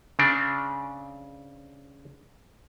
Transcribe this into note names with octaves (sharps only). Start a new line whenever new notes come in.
C#3 C4 D4